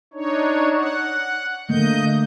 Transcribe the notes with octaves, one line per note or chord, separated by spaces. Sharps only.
D4 D#4 C#5
F#5
D3 A3 A#3 D#5 G6